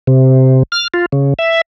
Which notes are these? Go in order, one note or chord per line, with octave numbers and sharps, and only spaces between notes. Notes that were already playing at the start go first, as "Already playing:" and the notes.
C3
F6
F4
C#3
E5